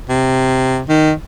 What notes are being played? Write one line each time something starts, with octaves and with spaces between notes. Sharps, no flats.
C3
D#3